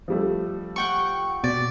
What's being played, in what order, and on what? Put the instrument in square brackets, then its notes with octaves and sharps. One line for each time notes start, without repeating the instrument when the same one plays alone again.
[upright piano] F3 G3 A3
[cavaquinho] F#5 G5 C#6
[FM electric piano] B2 [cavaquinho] D5